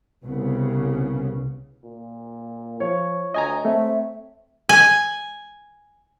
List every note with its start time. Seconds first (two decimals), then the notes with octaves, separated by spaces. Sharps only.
0.24 C2 C#3 B3
1.84 A#2
2.80 F3 C#5
3.34 D2 D#5 G#5 A#5
3.65 A3 C4 E5
4.69 G#5